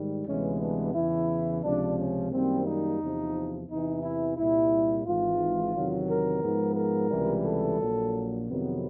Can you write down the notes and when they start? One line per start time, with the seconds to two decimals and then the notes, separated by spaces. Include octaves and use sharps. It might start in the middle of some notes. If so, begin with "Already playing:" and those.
Already playing: G#2 D#3 G3
0.26 D2 C3 E3 G#3 B3 C#4
0.60 D4
0.94 E2 C#3 E3 E4
1.62 C#2 C3 F3 D4
1.98 C#4
2.31 F#2 D#3 G3 A#3 C4
2.65 D#4
3.00 E2 C3 F3
3.68 E2 C3 E3 D#4
4.02 E4
4.37 C2 A#2 G3 E4
5.05 G#1 G#2 E3 F4
5.74 E2 C3 D#3 F#3
6.09 A#4
6.42 G#2 F3 G#3 B3
6.76 A#4
7.10 C#2 C3 E3 G3
7.46 A4
7.79 A#1 A#2 F#3
8.48 F2 C3 D#3 F#3 B3